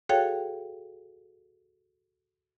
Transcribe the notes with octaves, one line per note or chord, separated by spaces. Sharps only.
F#4 G#4 A4 C#5 F5 G5